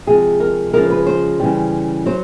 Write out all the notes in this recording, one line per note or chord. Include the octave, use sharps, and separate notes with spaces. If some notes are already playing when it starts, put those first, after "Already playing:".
C3 F3 G#3 G#4
A#4
C#3 F3 G#3 A#4
B4
C5
C#3 E3 G3
F#3 C5